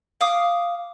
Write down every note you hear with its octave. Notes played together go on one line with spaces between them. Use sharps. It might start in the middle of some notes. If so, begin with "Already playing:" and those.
F5 D6 D#6